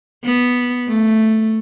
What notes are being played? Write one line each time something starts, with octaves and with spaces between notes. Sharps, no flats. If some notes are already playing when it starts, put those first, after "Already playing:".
B3
A3